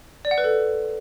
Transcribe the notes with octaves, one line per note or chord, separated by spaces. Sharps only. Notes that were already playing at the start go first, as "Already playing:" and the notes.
D5
F#5
B4
A4